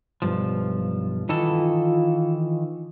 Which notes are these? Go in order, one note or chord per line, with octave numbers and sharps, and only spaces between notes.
B1 G2 F3
D#3 E3 F4 A4